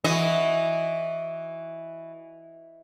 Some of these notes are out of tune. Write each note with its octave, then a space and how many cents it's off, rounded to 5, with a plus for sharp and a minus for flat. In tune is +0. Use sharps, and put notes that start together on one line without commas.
E3 +0 F#4 +0 D#5 +0